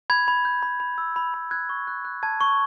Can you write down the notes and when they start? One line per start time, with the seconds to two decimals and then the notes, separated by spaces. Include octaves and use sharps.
0.10 B5 G#6
0.28 B5
0.45 G6
0.63 B5
0.80 B5
0.98 E6
1.16 B5
1.34 B5
1.51 F#6 G#6
1.69 C#6
1.87 F#6
2.05 F#6
2.23 A5 G#6
2.41 C#6